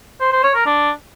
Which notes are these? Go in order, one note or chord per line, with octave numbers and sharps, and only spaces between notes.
C5
C5
C#5
A#4
D4